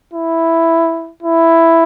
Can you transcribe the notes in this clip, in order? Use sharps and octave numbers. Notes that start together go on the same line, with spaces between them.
E4
E4